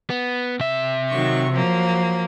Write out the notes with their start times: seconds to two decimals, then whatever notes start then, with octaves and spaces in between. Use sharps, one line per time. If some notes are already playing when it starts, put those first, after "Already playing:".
0.10 B3
0.60 C3 E5
1.09 D#3 F#3 C#6
1.51 F3 F#3 A#3